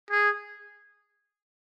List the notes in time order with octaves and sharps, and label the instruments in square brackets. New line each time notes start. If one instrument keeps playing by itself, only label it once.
[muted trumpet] G#4